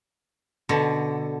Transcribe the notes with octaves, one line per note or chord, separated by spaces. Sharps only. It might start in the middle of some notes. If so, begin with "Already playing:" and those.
B2 D3